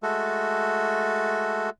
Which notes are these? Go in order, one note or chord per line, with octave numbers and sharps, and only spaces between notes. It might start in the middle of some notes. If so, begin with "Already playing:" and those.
G#3 A3 F#4 A4